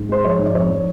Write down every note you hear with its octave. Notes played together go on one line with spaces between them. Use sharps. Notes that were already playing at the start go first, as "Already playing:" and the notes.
Already playing: G#2
G#3 C5
F3 C#5
G#2
D5
F2 C#5
F3